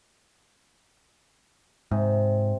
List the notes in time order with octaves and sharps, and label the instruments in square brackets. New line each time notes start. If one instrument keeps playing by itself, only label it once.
[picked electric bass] G#2 [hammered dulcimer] C3